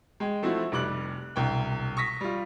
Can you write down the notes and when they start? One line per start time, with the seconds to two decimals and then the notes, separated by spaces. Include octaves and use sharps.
0.20 G#3 G5
0.42 F3 A3 C4 E4 F#4
0.72 F1 G3 D6 F#6 F#7
1.36 E1 C2 G5
1.97 C#6 D#6 A#6 B6
2.21 G3 F4